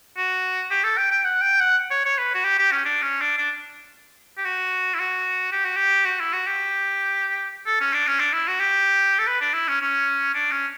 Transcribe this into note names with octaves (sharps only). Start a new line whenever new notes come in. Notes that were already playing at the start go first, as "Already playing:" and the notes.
F#4
G4
A4
G5
G5
F#5
G5
F#5
C#5
C#5
B4
F#4
G4
G4
C#4
D4
C#4
D4
D4
G4
F#4
E4
F#4
G4
F#4
G4
F#4
E4
F#4
G4
A4
C#4
D4
C#4
D4
E4
F#4
G4
A4
B4
D4
E4
C#4
C#4
D4
C#4